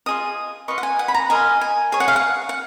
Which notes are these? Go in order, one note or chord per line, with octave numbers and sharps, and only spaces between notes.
F4 G#4 D#5 D#6
F4 B4 D#5 C#6
F#5
G#5
F#5
B5
A#5
F4 A#4 D#5 G#5
G#5
G#4 C#5 G#5
F#5
F5
F#5
F#5